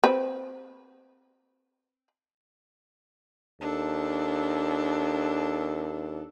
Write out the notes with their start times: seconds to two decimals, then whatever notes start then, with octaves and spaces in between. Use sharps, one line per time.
0.04 C4 B4
3.61 D#2 D4 A4